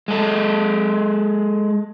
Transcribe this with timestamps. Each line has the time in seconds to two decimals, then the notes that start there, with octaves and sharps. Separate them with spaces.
0.08 G#3 A4